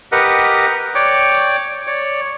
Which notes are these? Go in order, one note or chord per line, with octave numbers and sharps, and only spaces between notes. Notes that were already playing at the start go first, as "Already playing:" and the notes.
G4 A#4 B4 D#5 F#5
C#5 D5 G5 D6
C#5 D5